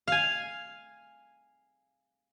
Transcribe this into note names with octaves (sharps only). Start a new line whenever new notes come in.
F5 G#5